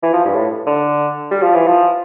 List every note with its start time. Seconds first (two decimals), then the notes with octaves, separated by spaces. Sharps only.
0.03 E3
0.14 F3
0.25 G2
0.35 A2
0.67 D3
1.31 G3
1.43 F3
1.55 E3
1.67 F3